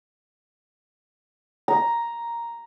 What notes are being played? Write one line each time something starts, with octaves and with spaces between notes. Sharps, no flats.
A#5